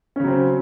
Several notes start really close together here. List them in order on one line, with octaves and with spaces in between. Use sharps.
C#4 C#3 F#3 C4